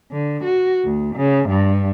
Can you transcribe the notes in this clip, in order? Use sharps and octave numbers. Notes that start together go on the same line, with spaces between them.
D3
F#4
D2
C#3
G2